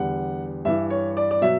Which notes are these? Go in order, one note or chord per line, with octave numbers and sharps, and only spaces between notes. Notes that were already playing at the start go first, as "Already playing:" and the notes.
Already playing: E2 D3 G3 F#5
G2 E3 G3 E5
C#5
D5
D5
B2 F#3 E5